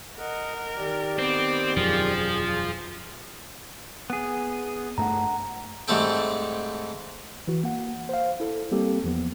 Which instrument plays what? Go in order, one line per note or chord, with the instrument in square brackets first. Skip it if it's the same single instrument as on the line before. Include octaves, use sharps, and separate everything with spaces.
[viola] A#4 [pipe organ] D#5 F#5
[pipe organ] D#3 G4 D5
[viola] B3 D6 [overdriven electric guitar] C4
[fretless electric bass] E1 F#2 [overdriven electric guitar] F3 [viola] G#4
[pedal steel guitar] B3 G#4
[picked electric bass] G2 A3 [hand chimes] F#5 A#5
[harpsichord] G#2 G3 A3 C4 A4 G5
[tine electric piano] E3 F#4
A#3 F#5
C5 F5
E4 A4
G3 A#3 C4 G4 A4
E2 F3 B3